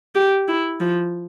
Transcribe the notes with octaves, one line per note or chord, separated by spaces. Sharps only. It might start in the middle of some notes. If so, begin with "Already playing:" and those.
G4
E4
F3